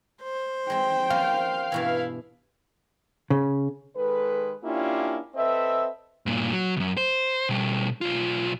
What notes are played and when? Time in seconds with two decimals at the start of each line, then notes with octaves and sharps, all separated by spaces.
0.23 C5
0.70 G#3 C4 G5
1.10 F3 A#3 C#4 F5
1.72 G2 B2 E3 E4
3.30 C#3
3.96 D#3 G#3 A4 B4
4.64 A#3 C#4 D4 E4 F4 G4
5.35 C4 A4 B4 D#5 E5
6.26 G2 A#2
6.52 F#3
6.76 C2 F#2
6.97 C5
7.49 B2 G3
8.01 B1 F4